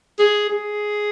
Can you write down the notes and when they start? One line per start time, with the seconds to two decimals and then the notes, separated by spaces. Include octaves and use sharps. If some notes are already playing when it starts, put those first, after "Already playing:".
0.19 G#4
0.49 G#4